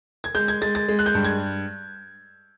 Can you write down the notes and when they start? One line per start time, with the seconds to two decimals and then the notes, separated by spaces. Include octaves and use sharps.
0.24 G#6
0.35 G#3 G6
0.48 G#6
0.61 G#3 A6
0.75 A6
0.88 G#3
0.99 F#6
1.06 G6
1.14 G2
1.25 G#6